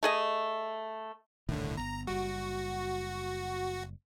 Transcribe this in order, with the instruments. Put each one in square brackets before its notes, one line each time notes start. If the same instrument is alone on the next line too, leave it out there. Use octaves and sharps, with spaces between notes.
[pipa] A3 G#4 D#5
[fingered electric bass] D#1 C2 D#3 [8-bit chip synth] A2 D3
[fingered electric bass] G1 D#2 B3 [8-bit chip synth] A#5
[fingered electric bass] F#1 G3 [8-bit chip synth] F#4